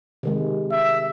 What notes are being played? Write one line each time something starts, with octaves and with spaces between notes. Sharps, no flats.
C3 D#3 G#3
E5